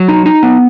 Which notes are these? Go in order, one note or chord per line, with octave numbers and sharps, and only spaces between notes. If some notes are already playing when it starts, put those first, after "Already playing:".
Already playing: F#3
D#4
D#4
B3